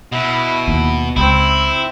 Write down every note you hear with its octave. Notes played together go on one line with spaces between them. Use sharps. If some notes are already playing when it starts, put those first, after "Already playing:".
B2 E4
D#2
C#2 C4 E4